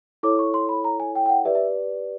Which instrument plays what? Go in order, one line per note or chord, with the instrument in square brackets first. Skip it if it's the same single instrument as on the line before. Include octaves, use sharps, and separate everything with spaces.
[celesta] E4 A4 C#5 D6
C#6
C6
B5
A#5
G#5
G5
G5
F#5
G4 B4 D5 E5
E5